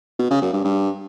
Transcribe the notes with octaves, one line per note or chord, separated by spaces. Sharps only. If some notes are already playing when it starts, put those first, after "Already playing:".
B2
C#3
F#2
G2
G2